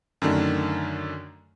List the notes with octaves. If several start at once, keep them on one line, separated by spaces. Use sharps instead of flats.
F#2 D3 D#3 A3 D4